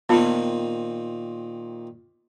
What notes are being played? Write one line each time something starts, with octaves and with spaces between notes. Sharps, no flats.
A#2 D#3 B3 C4 F4 B5